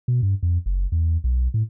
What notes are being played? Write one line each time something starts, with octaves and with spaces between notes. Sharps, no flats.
B2
G2
F2
F#1
E2
B1
A2